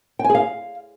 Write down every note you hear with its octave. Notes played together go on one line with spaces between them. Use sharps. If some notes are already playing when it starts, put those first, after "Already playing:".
G5
G#5
G#4
F5